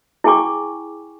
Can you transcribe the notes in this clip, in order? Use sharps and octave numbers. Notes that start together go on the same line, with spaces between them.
E4 G#4 G5 G#5 C#6 D6